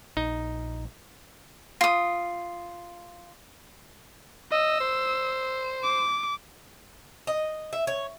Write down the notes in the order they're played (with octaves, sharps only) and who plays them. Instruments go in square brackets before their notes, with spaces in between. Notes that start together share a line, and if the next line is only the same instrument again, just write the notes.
[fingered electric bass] A#1 [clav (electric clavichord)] D#4
[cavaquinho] F4 D#6
[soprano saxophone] D#5 [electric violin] E6
[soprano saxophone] C5
[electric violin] D6
[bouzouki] D#5
E5
C#5